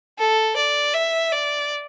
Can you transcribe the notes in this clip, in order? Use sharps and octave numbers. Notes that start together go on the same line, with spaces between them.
A4
D5
E5
D5